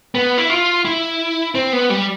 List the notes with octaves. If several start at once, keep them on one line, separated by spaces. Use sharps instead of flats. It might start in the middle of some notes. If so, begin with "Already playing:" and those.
B3
E4
F4
E4
C4
B3
G3